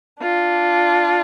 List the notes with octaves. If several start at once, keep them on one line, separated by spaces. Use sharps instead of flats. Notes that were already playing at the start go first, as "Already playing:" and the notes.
D4 F4